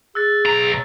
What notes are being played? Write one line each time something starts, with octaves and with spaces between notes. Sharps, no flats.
G#4 E6 F#6 A6
B1 A#5